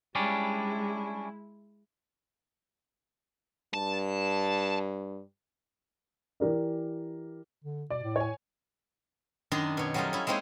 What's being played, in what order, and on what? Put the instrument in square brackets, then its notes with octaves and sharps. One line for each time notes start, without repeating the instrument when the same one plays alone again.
[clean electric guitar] G3 C#4 D4 [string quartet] G#3 E4
[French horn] G2 [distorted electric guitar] A5
[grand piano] E3 G4 A#4 D5
[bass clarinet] D3
[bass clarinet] B2 [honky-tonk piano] D5
[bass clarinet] A2
[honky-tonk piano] C#5 G#5
[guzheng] F#2 D#3 D4 D#4 A#5 C6
B2 C#5
F#3 G3 A3 C#4 D#4 F4
C#4 E4
G#3 A#3 C4 D#4 C#5